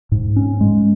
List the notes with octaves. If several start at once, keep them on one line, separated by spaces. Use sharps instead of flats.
G#2
C#4
G#3